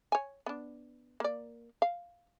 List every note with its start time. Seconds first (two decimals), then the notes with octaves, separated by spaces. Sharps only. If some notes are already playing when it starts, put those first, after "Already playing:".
0.12 C#5 G#5
0.46 B3 D4
1.20 A#3 D5
1.82 F5